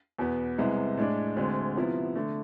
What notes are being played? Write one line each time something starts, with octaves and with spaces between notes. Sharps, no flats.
E2 B2 B3
C2 C3 G#3 B3 E4
A2 G#3 D4
D2 D3 G#3 C4
C3 F3 B3 E4
D3 A3